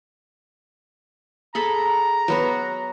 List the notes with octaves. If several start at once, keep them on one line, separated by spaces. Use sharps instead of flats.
G#4 A4 A#5 B5
F#3 B3 F#4